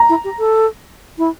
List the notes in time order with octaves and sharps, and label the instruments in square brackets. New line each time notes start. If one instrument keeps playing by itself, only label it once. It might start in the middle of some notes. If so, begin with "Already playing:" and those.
Already playing: [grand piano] A#5
[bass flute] E4
G4
A4
E4